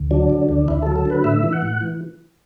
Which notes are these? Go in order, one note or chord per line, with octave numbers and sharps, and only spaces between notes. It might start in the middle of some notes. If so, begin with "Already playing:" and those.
Already playing: D2
F#3 D4
D3
D2
D2 E4
F#3 A4
A4
D3 B4
A2 E5
E3
F#5
A2
E3